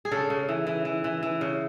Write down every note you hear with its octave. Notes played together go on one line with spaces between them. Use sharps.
G#4
C#3 A4
C#3
E3
E3
E3
E3
E3
C#3